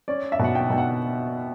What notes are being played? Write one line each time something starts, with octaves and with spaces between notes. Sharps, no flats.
C#4 D5
E5
B2 F#5
G5
B2 G5
F#5